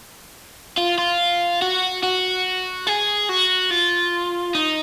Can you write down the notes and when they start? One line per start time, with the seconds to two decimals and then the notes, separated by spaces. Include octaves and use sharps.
0.78 F4
0.98 F4
1.62 F#4
2.03 F#4
2.87 G#4
3.29 F#4
3.70 F4
4.55 D#4